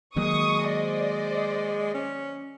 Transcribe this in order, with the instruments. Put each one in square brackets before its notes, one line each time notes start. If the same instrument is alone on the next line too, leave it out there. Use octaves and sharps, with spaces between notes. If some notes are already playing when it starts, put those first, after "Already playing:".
[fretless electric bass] D#3 F#3 A#3 [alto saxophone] G#3 [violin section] C#6 D#6
[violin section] C5 D5 D#5
[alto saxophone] C#4